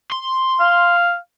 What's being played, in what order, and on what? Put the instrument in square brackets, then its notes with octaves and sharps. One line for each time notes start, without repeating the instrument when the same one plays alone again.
[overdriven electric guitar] C6
[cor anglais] F5